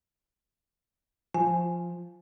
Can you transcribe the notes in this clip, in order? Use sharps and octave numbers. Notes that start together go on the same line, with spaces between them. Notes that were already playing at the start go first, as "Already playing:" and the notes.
F3 G#5